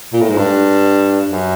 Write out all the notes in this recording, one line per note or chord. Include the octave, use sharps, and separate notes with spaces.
A#2
A2
G#2
G2
F#2